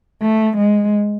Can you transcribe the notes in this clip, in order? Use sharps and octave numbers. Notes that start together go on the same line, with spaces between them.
A3
G#3